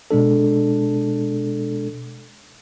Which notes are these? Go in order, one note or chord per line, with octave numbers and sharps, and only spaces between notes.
B2 G#3 D4 A4